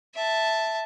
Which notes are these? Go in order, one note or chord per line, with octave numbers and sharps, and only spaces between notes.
E5 A5